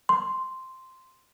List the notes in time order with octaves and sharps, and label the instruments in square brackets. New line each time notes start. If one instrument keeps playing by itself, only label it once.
[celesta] C6